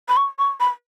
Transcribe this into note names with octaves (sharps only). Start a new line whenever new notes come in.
B5
C#6
C#6
B5